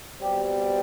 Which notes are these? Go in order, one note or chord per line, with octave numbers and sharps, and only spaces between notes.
B2 G3 C4 G4